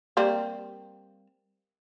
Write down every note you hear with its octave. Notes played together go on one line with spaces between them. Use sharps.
G3 A#3 C4